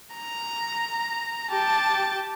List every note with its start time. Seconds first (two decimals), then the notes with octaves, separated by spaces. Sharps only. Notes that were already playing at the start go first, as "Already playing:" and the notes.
0.15 A#5
1.51 G4 A5